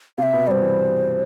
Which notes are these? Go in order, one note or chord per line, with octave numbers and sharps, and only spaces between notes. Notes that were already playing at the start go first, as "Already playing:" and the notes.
C3 C4 E5 F5
B2 B3
G2 G3 C5 D5
E3